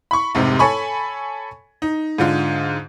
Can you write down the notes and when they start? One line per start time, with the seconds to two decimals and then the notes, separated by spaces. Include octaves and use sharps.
0.11 B5 C#6
0.35 F1 G#2 C3
0.59 A4 C#5 G#5 B5 C#6
1.82 D#4
2.18 G#2 D3 F4